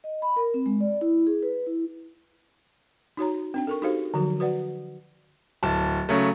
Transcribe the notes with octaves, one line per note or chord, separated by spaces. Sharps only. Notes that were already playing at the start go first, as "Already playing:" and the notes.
D#5
B5
A#4
C4
G#3
D5
E4
G#4
B4
E4
D#4 F#4 C#5 A#5
C4 D4 G5
A4 A#4 C#6
D#4 F#4 G4 A4 C5 F5
D3 F3 F#3 F#4
F#4 B4 D5 F#5
D1 A5
C#3 F#3 A3